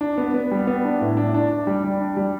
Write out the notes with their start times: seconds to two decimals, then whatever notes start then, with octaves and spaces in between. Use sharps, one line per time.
0.01 D4
0.18 B3
0.34 B3
0.51 G3
0.67 B3
0.85 D4
1.01 A2
1.17 D4
1.34 D4
1.51 D4
1.67 G3
1.84 G3
2.01 D4
2.17 G3